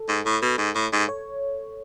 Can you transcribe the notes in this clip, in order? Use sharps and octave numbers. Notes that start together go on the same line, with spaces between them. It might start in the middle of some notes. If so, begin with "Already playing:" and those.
Already playing: A4
G#2
A2
B2
G#2
A2
G#2
C#5